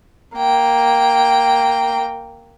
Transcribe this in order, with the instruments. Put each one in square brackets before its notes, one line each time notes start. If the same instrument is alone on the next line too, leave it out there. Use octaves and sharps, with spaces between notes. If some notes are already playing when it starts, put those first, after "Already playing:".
[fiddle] A#3 G5